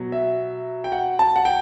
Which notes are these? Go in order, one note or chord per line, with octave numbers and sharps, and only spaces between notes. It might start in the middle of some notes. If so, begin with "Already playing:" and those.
Already playing: B2 F#3
E5
G5
F#5
A5
F#5
G5